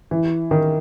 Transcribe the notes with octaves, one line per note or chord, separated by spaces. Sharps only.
E3
D#3